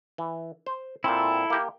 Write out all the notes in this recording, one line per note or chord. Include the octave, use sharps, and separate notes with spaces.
E3
C5
A#2 C4 E4 A4
A#3 G4